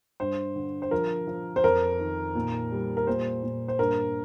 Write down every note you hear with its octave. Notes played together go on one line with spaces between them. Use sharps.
G2 C5
D3
C5
F3 A#4
F3
C5
F2 A#4
D#3
A#2
G3
A#4
A#2 C5
A#2
C5
G2 A#4